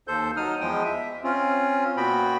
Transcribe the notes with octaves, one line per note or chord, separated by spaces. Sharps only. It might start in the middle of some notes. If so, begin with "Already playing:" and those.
D#2 A4 C5 G6
F#3 D#4 D#6 F6
E2 F3 G#3 G5 D#6
E5
C4 C#4 F4
A#2 B3 F#4 G5 B5